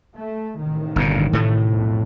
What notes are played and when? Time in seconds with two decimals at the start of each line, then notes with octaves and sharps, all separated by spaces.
0.17 A3
0.59 A1 C3 D#3
0.96 G1 G2 A#2
1.33 A2 A3
1.71 B1 F2